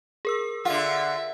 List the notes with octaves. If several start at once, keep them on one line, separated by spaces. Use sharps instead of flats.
G#4 A#4 E6
D3 F4 E5 F#5